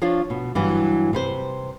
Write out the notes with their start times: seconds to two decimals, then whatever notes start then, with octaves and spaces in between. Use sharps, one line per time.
0.02 F3 D4 F4 C#5
0.30 B2
0.55 G2 E3 F#3
1.13 C3 B4 C5